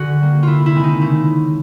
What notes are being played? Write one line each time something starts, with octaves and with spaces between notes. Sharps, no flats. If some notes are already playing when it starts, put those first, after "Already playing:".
Already playing: D3 F#4 G#4
G3 A#3
C3 E4 F4
E4
D#3 G#3 C4
D#4
C#3 E4